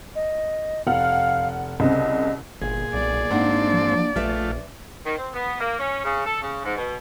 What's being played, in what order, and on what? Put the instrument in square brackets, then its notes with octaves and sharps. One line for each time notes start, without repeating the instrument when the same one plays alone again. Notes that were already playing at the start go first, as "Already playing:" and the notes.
[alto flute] D#5
[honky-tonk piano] F1 F#5 F6 [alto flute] F5
[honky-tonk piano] C2 C#3 C4 [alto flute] D#5
[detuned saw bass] G1 [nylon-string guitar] A#2 [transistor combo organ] G#4
[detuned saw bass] B1 [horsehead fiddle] D5
[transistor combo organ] G#2 C4 [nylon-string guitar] A#3 D4 F#5 [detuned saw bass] D#4
[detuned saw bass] F3
[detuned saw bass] A#1 [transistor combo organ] A3 F4 [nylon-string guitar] B4 E5
[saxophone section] D#3
C4
B3
A#3
C#4
C#3
A4
C#3
G#2
B2